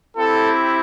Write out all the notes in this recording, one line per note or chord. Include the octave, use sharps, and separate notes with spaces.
C4 E4 G4 A4